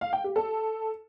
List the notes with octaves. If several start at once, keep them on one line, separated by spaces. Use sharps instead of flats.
F5
G5
G4
A4